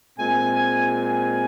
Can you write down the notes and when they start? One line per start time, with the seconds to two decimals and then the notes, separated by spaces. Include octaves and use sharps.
0.18 A#2 G#3 C4 G#5
0.55 G#5
0.92 G#5